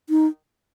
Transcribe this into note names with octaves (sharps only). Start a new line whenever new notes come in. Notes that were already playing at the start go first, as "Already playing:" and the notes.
D#4